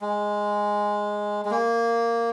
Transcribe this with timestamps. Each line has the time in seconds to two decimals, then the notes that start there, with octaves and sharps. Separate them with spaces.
0.01 G#3
1.45 G#3
1.51 A#3